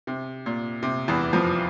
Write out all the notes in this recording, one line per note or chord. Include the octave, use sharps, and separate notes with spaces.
C3
A#2
C3
E2 E3
F2 F3